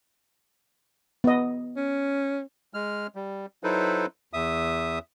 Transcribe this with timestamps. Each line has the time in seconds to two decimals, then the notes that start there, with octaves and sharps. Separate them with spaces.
1.24 B3 D#5
1.77 C#4
2.74 G#3 F6
3.15 G3
3.64 F#3 D#4 E4 A4 B4 C5
4.33 E2 E5 D#6